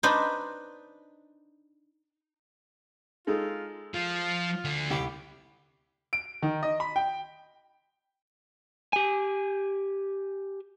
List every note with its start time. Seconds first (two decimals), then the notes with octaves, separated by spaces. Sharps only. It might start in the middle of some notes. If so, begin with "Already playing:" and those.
0.03 D4 D#4 B4 C5
3.27 G#3 D#4 F4 A4
3.94 F3 F4
4.65 D2 D3
4.90 C2 G4
6.13 D7
6.42 D#3
6.63 D#5
6.80 B5
6.96 G5
8.93 G4 G#5